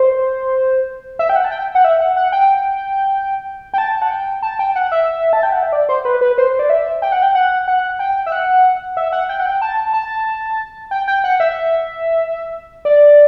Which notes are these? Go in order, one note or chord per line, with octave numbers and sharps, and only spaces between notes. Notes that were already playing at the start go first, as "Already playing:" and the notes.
Already playing: C5
E5
G5
F#5
A5
G5
F#5
E5
F#5
F#5
G5
G5
A5
F#5
G5
A5
G5
F#5
E5
A5
G5
F#5
E5
D5
C5
B4
B4
C5
D5
E5
G5
F#5
G5
F#5
F#5
G5
E5
F#5
E5
F#5
G5
F#5
G5
A5
A5
G5
G5
F#5
E5
D5